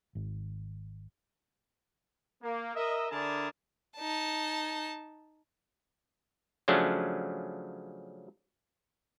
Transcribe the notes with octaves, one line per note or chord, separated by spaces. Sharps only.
G#1
A#3
A#4 D#5 E5
D3 D4 E4 G#4 A#4 A5
D#4 A5
C#3 F3 F#3 A3 C#4 D4